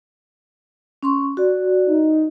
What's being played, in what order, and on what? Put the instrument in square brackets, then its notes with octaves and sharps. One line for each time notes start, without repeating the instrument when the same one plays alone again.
[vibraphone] C#4 C6 C#6
F#4 D5
[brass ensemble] D#4